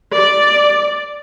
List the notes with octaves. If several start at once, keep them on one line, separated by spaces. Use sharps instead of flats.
D5